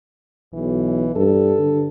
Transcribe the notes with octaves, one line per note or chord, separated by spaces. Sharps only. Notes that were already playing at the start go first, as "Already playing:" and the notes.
B1 E3
G2 A4
D3